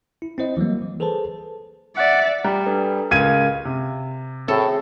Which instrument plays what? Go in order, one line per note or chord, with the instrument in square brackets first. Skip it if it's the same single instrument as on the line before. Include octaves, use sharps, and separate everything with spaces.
[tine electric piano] E4
C4 E4 C5 D#5
E3 F#3 G3 A#3
E3
G#4 A4 B4 C5 A5
[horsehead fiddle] D5 E5 [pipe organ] F#5
[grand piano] G3 [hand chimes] A#5
[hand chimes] D4 A4 B4
[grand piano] C#2 G#6 D#7 [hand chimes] A#4 F5 F6
[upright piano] C3
[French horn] A2 [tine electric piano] C4 G#4 [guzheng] A4